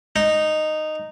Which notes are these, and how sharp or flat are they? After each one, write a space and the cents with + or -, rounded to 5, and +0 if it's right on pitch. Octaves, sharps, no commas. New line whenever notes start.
D#4 -10